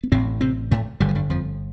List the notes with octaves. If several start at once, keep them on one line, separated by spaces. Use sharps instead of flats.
B3
A1 A2 C3 C4
C3 C4
A2 A3
G1 G2 D3 G3
F3
G2 G3
F2 F3